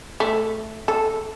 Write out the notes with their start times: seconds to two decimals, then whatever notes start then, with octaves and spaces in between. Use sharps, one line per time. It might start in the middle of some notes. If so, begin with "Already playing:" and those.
0.20 A3
0.88 A4